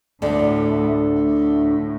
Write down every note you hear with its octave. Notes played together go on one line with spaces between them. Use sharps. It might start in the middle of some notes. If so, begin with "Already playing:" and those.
D2 A2 D3
A2